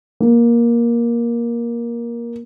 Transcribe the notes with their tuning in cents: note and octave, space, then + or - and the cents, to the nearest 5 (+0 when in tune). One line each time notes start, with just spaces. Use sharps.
A#3 +15